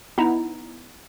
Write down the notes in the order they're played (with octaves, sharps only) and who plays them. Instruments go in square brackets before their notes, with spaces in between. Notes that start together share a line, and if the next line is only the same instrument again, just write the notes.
[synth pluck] B3 D#4 E4 A#5